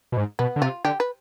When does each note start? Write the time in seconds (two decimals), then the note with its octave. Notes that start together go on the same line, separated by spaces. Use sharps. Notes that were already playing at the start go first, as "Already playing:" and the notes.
0.12 B2
0.17 G#2
0.39 B2 B3
0.56 D3
0.62 C3 F4
0.85 D3 G4
1.00 B4